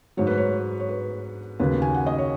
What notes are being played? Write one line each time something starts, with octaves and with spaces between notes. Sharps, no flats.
G#2 F#3 C#5
B4
C#5
C#5
B4
D#2 C#3 F#3 B4
G#5
F#5
D#5
C#5